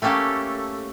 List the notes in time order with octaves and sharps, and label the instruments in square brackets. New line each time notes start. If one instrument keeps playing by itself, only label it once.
[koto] A3 A#3 C#4 G4 A4